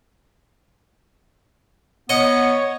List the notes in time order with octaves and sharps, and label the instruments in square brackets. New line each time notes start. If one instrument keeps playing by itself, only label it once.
[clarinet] B3 [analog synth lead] C#5 [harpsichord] D#5 F#5